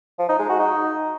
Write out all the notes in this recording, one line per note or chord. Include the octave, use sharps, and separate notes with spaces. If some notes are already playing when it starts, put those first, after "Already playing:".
F3
D#4
G#3
F#4
D#4